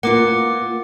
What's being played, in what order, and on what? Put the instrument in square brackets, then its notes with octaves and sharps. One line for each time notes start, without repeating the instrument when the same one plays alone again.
[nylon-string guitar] A#3 B3 F4 [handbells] F#5 D6